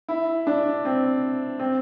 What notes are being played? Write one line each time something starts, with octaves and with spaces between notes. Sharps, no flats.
E4
D4
C4
C4